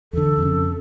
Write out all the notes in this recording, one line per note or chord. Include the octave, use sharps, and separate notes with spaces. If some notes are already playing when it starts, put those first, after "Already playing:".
E2 D3 A4
F2 C#3